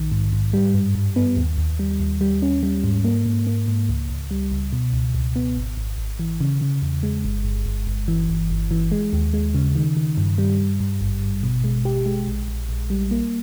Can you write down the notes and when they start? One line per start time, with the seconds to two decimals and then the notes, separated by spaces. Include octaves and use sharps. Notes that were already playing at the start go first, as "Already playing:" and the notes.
Already playing: A#1 D#3
0.12 G#2
0.33 G#2
0.53 G3
0.74 G2
0.95 G2
1.16 B3
1.37 D#2
1.58 D#2
1.79 G3
2.00 D#2
2.21 G3
2.42 C#4
2.63 G3
2.84 G#2
3.04 A#3
3.26 G#2
3.47 A#3
3.68 G#2
3.89 C#2
4.09 C#2
4.31 G3
4.52 C#2
4.73 B2
4.93 C#2
5.14 C#2
5.36 B3
5.56 G#1
5.77 G#1
5.98 G#1
6.19 E3
6.41 C#3
6.61 C#3
6.82 E2
7.03 G#3
7.24 G1
7.45 G1
7.66 G1
7.87 G1
8.08 E3
8.29 G1
8.50 G1
8.71 E3
8.92 G#3
9.13 D#2
9.33 G#3
9.55 C#3
9.75 D#3
9.97 D#3
10.17 G2
10.38 G3
10.59 G2
10.80 G2
11.01 G#1
11.22 G#1
11.43 B2
11.64 G#3
11.85 G4
12.06 G#3
12.27 A#1
12.48 A#1
12.69 A#1
12.90 G3
13.11 A#3